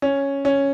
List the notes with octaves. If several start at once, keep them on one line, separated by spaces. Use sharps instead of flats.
C#4
C#4